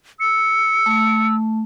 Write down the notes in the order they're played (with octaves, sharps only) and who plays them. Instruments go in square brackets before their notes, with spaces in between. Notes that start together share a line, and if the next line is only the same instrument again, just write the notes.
[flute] E6 [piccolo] C#7
[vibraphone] A3